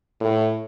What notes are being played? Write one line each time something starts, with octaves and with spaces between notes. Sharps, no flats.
A2